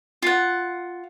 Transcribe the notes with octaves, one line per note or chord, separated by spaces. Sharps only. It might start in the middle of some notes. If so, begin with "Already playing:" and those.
F4 F#5